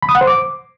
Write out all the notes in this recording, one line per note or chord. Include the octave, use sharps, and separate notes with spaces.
B5
D#6
F#5
C5
D6